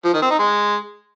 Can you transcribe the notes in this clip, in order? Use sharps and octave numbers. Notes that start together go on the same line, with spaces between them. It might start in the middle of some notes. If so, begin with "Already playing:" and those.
F3
D#3
C4
D#4
G#3